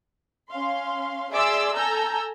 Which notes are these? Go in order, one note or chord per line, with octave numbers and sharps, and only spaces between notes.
C#4 F5 C6
G#4 D5 E5 C6 D6 E6
A4 G#5 A#5 E6 G6